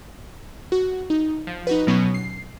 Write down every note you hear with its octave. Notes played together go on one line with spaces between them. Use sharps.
F#4
D#4
F3
D#4 F#4 B4
B2 F#3 B3 C#4
C7